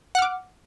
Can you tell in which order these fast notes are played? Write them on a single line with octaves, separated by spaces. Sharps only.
F#5 F6 D6